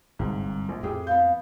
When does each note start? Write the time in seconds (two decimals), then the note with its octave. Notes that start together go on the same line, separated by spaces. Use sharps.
0.19 G1 C2 G#2
0.69 A#1
0.83 F2 A2 G4 G#4
1.07 B3 F5 G6